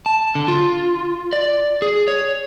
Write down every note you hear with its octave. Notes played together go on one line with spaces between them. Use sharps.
A5
D3
F4
D5
G#4
C#5